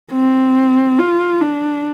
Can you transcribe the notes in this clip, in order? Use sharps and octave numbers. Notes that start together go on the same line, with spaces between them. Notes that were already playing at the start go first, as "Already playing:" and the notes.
C4
F4
D4